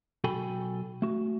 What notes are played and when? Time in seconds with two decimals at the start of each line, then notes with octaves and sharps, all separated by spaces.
0.24 B1 F#4 A4 G5 G#5 B5
1.02 A3 F#4